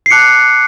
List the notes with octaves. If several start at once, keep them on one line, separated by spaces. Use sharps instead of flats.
C7
A5 D6 F#6 C#7